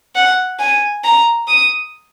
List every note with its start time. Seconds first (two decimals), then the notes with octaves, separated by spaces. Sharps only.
0.15 F#5
0.60 G#5
1.04 A#5
1.48 D#6